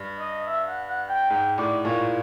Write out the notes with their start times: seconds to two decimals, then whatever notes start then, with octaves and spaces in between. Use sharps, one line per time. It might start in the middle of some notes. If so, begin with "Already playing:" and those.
Already playing: G2
0.19 D#5
0.47 E5
0.67 F#5
0.88 F#5
1.09 G5
1.30 G#2 G5
1.58 A2 D5
1.85 A#2 C#5